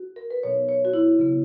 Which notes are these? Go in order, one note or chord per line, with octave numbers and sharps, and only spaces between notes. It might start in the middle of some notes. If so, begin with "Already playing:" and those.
Already playing: F#4
A#4
B4
B2 F#3 B3 D#4 C#5
C#5
F#4
E4
C#3 F#3 B3